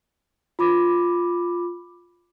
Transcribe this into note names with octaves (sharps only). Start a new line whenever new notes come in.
F4 B5 D6